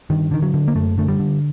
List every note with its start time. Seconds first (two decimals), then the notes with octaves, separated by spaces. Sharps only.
0.10 G2 D#3
0.31 D3 D#3
0.42 F#3
0.54 D3
0.68 A#3
0.75 F#2 A3
0.98 D3 A3
1.08 G3
1.19 D3